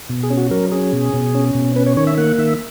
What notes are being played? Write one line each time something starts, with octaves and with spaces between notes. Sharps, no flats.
B2
G#4
C#4
F#4
F#3 A#4
C#4 G#4
B2
B2
C#4
B2
C#4 B4
C#5
D#3 C#5
E5
A#3 F#5
D#3 E5